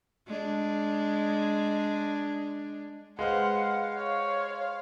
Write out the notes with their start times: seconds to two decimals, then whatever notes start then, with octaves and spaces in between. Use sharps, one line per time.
0.27 G#3 D4
3.19 G#3 B4 C5 F5 F#5
3.98 C#5